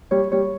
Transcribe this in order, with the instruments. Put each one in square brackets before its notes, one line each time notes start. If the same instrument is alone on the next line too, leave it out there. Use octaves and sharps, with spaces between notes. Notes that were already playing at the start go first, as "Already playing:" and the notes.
[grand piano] G3 [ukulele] C#5
[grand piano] G3 [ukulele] C#5